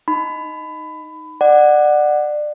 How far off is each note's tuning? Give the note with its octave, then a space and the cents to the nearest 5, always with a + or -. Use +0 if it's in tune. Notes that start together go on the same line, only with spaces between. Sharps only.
D#4 +0 B5 +20
D5 +25 F#5 +0